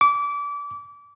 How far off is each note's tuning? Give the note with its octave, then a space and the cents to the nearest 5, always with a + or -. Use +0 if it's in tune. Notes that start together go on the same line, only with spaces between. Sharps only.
D6 -25